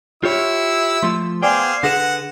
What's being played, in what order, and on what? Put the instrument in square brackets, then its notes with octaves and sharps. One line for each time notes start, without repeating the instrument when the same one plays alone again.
[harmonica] E4 E6 [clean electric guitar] F4 G4 C#5
[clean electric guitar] F3 A3 F4 [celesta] C6
[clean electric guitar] B3 G5 [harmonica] G#4 C5 F5 [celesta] D5 G#5 D6
[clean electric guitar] D3 G#4 B4 [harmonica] F#5 [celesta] A#6 E7